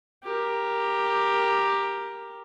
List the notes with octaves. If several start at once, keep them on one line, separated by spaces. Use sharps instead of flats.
G4 A#4